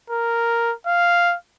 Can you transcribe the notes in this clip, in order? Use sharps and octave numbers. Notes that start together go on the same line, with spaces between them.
A#4
F5